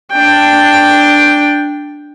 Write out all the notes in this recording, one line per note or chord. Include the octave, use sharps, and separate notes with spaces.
D4 G5